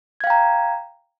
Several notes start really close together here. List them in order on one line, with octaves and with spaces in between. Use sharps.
G#6 F5 G5 A#5